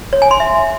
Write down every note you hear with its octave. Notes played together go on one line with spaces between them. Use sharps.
C#5
G#5
C6
E5